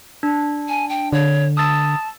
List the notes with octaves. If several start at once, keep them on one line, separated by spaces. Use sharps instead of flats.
D4
G#5
G5
D3 C#5
A5 D#6 E6 A6